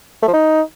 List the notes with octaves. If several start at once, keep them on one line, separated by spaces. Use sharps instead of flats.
A3
F3
D#4